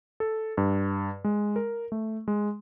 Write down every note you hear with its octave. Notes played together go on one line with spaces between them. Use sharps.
A4
G2
G#3
A#4
A3
G#3